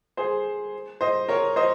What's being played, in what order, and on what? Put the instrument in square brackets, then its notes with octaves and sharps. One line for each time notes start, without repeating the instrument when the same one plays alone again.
[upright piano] G#4 C5
C5 D#5
A#4 C#5
C5 D#5